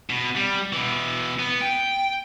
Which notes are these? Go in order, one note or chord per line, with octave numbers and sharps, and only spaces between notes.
B2
G3
B2 E3
B3
G5